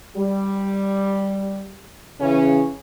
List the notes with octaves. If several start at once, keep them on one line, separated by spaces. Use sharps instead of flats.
G3
C#3 E3 C#4